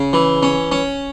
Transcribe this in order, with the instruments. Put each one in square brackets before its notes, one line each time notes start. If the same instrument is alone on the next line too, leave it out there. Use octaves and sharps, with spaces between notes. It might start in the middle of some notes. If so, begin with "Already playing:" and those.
Already playing: [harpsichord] C#3
E3
C#4
C#4